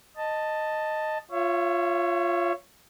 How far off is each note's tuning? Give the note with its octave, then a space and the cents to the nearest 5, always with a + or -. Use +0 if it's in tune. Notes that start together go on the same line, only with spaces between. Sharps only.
D#5 -5 A5 +5
F4 +0 C#5 +0 E5 +40